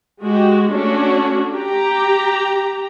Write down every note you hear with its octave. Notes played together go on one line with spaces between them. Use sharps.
G#3 F#4 G4
A3 C#4 D4 F#4
G4 A#5